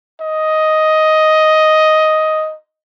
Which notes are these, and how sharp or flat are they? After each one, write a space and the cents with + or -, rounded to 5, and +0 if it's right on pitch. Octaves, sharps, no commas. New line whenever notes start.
D#5 +5